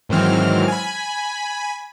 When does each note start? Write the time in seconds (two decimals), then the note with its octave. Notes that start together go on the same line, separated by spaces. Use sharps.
0.09 G#2 D#3 E3 F#3 C4 F6
0.68 G#5 B5